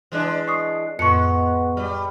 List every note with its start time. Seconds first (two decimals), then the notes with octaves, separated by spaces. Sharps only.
0.12 E3 G#3 D4
0.48 C#6 D#6 C7
0.99 F2 A2 G#3 B3 C#6 C#7
1.77 G3